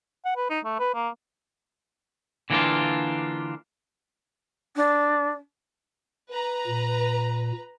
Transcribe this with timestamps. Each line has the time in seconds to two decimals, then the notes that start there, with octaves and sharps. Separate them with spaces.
0.25 F#5
0.36 B4
0.50 D#4
0.65 A3
0.79 B4
0.94 A#3
2.50 D3 E3 A#3 C4 D4 F4
4.76 D4
6.30 B4 A#5
6.67 A#2